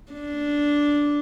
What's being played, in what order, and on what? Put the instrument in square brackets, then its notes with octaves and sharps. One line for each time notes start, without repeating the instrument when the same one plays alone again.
[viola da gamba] D4